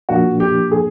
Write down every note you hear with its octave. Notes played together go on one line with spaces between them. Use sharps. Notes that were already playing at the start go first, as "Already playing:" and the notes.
A#2 F3 A#3 D4 F#4
G4
G#4